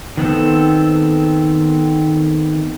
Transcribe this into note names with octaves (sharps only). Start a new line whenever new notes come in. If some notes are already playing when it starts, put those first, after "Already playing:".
D#3 B3 C4 A4